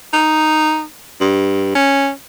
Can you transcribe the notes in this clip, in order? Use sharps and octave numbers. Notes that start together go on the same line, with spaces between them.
D#4
G2
C#4